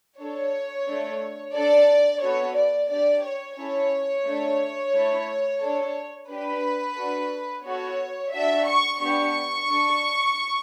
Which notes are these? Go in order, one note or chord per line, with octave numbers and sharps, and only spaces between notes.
D4 A4 C#5
A3 D4 A4
D4 A4 D5
B3 F#4 A4 C#5
D5
D4 G4 D5
C#5
C#4 E4 A4 C#5
A3 D4 A4
A3 E4 A4
D4 A4
D4 G4 B4
D4 F#4 A4
B3 F#4 A4 C#5
D4 F#4 A4 E5
C#6
B3 D4 G4 C#6
D4 A4